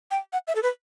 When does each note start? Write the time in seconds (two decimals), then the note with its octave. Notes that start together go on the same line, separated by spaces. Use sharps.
0.11 G5
0.33 F#5
0.47 E5
0.55 A4
0.62 B4